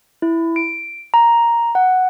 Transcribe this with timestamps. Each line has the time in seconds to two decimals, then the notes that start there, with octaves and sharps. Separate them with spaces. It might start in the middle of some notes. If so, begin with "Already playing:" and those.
0.22 E4
0.56 D7
1.14 A#5
1.75 F#5